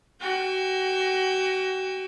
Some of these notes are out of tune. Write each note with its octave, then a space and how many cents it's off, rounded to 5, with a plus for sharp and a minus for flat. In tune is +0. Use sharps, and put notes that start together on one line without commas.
F#4 +30 G5 +40